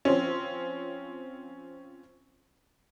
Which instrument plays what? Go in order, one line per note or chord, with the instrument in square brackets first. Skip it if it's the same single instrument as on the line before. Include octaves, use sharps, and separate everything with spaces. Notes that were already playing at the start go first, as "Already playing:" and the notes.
[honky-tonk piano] F3 C4 C#4